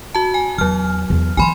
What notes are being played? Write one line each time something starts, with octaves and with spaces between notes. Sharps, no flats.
F#4 A5
G#5
E2 F#3 F6
E2
E3 B3 G#5 B5 C6